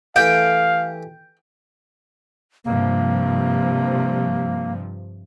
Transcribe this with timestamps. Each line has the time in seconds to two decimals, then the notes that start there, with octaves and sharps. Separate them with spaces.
0.16 E3 A3 G4 F5 G5
2.65 G2 C3 F3 A#3